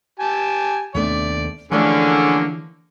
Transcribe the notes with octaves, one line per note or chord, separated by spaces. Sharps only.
G4 G#5 A5
D#2 C3 A3 B3 D4 D5
D3 E3 F3 A3 A#3 C#4 G#4 D5